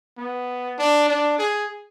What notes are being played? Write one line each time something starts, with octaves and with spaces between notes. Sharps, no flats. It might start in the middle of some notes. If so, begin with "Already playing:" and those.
B3
D4
D4
G#4